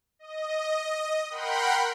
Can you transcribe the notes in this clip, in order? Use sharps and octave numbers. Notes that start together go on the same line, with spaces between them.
D#5
A#4 F#5 G5 B5 C6